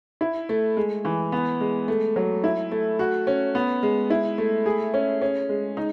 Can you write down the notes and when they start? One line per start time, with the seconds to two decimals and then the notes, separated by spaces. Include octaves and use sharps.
0.21 E4
0.49 A3
0.77 G#3
1.05 E3
1.32 B3
1.61 G#3
1.88 A3
2.16 F#3
2.44 E4
2.71 A3
2.99 F#4
3.27 C#4
3.55 B3
3.83 G#3
4.10 E4
4.38 A3
4.66 G#4
4.94 C#4
5.22 C#4
5.49 G#3
5.77 D#4